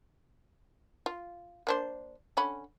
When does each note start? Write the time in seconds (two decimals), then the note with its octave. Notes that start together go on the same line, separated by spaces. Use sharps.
1.06 F4
1.67 A#3 D4 C5
2.37 D3 C#4 B5